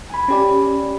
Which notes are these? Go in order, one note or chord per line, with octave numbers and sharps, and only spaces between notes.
G#5 B5
C#4 G4 D5